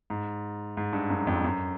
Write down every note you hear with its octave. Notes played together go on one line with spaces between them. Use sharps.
G#2
G#2
G2
F#2
F2
F#2